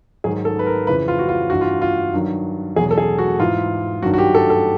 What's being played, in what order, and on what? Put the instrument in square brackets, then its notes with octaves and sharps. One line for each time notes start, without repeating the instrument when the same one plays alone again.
[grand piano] G#2 D#3 F#3 G#4
A4
B4
A#4
F2 C#3 E3 B4
F4
F#4
F4
G2 E3 F#4
F4
F4
G2 D#3 F#3
E2 B2 F#3 G#4
A4
G#4
F#4
G#2 E3 F4
G2 D#3 F#3 F#4
F#4
G4
A4
A4